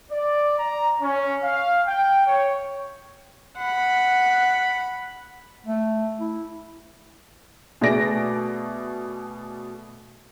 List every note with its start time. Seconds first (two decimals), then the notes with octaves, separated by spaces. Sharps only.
0.10 D5
0.59 A#5
1.01 C#4
1.43 F5
1.87 G5
2.27 C#5
3.58 F#5 B5
5.66 A3
6.20 E4
7.81 B2 A3 G#4 D5 A#6 D7